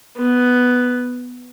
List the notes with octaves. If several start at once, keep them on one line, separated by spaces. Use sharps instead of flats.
B3